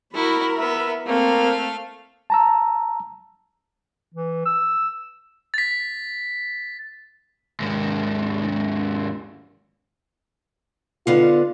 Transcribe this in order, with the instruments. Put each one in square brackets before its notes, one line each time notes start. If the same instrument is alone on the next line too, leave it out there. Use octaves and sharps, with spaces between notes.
[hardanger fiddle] E4 F#4 [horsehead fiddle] A#4 B5
[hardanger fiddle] B3 B4 [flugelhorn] E5
[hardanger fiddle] A3 F5 [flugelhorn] A#3 [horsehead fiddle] C4
[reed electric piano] A5 A#5 E6
[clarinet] E3
E6
[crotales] A6 B6
[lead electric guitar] D#2 G#2
[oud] D3 B3 F5 [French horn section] D#4 F4